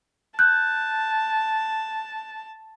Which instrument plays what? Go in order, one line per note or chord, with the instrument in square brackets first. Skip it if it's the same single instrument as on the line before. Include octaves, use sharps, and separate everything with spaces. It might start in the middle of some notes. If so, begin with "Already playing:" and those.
[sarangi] A5 [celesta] F#6 G6